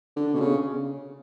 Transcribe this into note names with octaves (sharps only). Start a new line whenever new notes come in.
D3
B2
C#3